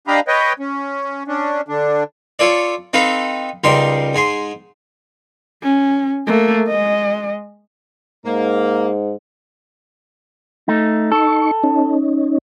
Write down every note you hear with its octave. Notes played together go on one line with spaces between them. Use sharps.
D4 G4 D#5 F5 A#5 B5
B4 C#5 D#5 G5
C#4
C#4 D4
D3 D4
F4 A4 C#5 D5
C4 D#4 A4 B4 F5
C#2 G3 D#4 A#4 C5 C6
G#2 G#5 C6
C#4
A3 A#3
G#3 D#5
G#2 A#3
A3 D#4
D#4 A4 C#6
C#4 D#4